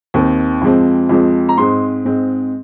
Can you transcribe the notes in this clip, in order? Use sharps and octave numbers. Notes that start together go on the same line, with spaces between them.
D#2 D#3 C4
F2 F3 G#3 C4
F2 F3 G#3 C4
A#5
G#2 G#3 C4 C6
G#2 G#3 C4